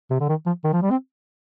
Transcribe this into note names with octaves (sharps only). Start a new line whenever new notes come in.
C3
D3
D#3
F3
D#3
F3
G3
C4